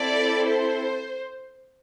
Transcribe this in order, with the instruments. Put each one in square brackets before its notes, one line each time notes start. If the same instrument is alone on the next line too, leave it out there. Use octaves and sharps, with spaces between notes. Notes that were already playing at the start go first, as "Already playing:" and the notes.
Already playing: [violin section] C4 E4 A4 D5
C5